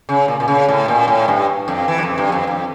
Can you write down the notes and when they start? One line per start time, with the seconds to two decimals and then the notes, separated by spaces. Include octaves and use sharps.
0.09 C#3
0.28 A#2
0.40 A#2
0.48 C#3
0.69 A2
0.88 A#2
1.08 A2
1.28 G2
1.68 F2
1.88 E3
1.98 G2
2.03 F2
2.18 G2
2.32 F2
2.47 F2